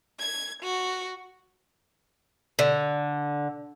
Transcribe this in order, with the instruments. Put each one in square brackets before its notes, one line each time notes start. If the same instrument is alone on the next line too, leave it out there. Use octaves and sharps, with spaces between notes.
[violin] G#6
F#4
[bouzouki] D3